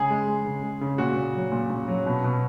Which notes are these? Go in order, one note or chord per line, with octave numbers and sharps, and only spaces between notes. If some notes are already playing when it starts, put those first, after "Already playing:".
Already playing: C#3 G#3 G#4
G#3
G#3
C#3
G#3
C#3
A#2 F#4
A#2
F#3
A#2
A#2
F#3
B2
B2